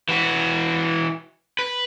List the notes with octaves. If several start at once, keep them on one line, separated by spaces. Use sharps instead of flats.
E3 F#4
B4